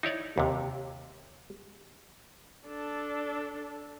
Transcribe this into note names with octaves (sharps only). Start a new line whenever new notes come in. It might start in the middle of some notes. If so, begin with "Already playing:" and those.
D#4 E4 C#5 D5
D#2 C3
D4 A4